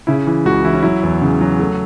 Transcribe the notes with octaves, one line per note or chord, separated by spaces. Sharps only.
C#3 E4
E3
C#2 F#4
E3 E4
C#4
F#3 E4
E2
C#3
F#3
A3